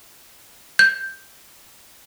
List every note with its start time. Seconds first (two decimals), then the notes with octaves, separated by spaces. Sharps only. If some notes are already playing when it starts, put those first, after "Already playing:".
0.79 G6